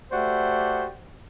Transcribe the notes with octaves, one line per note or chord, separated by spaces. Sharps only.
A3 F#4 G4 C5 D5